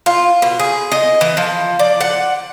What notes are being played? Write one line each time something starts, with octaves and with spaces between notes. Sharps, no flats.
F4
B2
G#4
D#5
E3
F3
D5
F#5